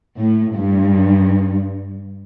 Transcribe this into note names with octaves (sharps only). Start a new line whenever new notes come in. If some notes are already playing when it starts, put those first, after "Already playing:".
A2
G2